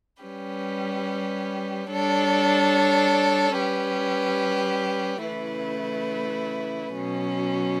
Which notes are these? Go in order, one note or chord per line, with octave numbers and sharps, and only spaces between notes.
G3 C#4 G4 B4
G3 D4 A4 C#5
G3 C#4 G4 B4
C#3 E3 A3 E4 B4
B2 F#3 C#4